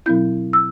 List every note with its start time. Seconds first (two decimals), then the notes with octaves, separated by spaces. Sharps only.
0.06 B2 F#3 C4 E4 G6
0.53 E6